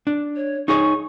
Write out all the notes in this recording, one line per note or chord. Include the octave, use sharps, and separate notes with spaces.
D4
C#5
D#4 G#4 C#5 C#6